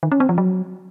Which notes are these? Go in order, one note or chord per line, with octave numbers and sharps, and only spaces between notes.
D#3
C#4
C4
F3
F#3